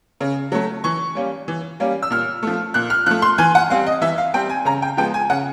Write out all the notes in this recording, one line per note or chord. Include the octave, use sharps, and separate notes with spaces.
C#3
F#3 A3
E3 C#6
G3 A#3 C#4
E3
G3 A#3 C#4
E6
A#2 F6
F3 A3
A#2 F#6
F6
F3 A3 F#6
C6
E3 G#5
F#5
G3 C4 F5
D#5
E3 E5
F5
G3 C4 G5
G#5
C#3 A#5
G5
F3 G#3 B3 G5
G#5
C#3 F#5